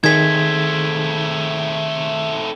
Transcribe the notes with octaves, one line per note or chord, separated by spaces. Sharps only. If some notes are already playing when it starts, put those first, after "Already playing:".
D#3 A3 C4 G#4 G#6 B6